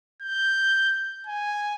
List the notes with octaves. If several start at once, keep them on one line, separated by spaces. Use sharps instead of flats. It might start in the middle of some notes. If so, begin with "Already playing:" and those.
G6
G#5